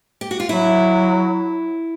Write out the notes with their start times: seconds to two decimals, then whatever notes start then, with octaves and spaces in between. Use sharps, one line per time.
0.21 G4
0.31 F#4
0.40 F4
0.49 F#3 E4